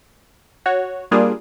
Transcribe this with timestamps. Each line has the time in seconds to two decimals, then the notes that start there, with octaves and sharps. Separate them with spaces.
0.66 F#4 C#5
1.11 G3 A#3 D4 F4 G#4